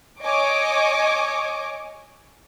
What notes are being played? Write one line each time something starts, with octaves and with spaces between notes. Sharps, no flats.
C#5 D#5 G#5 C#6 D6